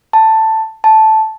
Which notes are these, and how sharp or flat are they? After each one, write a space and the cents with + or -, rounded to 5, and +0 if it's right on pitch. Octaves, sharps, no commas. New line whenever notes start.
A5 +10
A5 -5